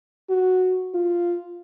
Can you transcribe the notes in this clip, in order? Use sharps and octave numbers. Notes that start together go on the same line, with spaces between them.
F#4
F4